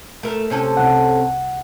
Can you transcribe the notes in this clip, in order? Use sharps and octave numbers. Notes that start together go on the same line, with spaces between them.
A3 A#4
C3 C#4 A4
C2 F#5